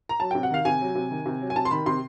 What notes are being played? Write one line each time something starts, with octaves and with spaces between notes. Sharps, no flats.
A#5
F#3 A5
C3 G5
F#5
D#3 F5
C3 G#5
F#3
C3
D#3
C3
F#3
G#5
C3 A5
C6
D#3 B5
C3 C6